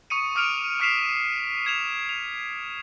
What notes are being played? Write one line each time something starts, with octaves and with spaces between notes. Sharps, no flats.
C#6 D#6 C#7 D#7
D6 D#6 F6 C#7 D7 F7
C#6 F6 B6 C7 E7 F7
G#6 E7 F7
F7